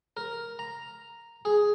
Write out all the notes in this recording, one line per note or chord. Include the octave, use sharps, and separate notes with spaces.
A#4
A#5
G#4